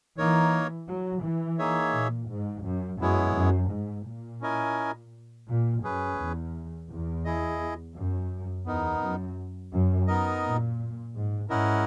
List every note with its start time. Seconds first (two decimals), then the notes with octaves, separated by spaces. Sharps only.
0.18 E3 A#3 D#4 A#4 C#5
0.88 F#3
1.23 E3
1.59 A#3 D#4 G#4 C#5 E5
1.94 A#2
2.30 G#2
2.64 F#2
3.00 F#2 G#3 B3 E4 G#4 C#5
3.35 F#2
3.70 G#2
4.06 A#2
4.41 C#4 E4 A#4 D#5 G#5
5.48 A#2
5.83 F#2 C#4 G#4 B4
6.19 E2
6.90 E2
7.25 E4 G#4 D#5
7.95 F#2
8.66 E2 B3 D#4 A#4
9.01 F#2
9.73 F#2
10.07 B3 D#4 A#4 D#5
10.43 A#2
11.14 G#2
11.49 G#2 C#4 E4 A#4 D#5 F#5